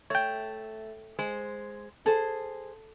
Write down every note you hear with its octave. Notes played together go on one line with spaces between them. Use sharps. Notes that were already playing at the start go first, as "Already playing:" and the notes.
A3 C#5 G5
G#3 C5
G#4 A4 C5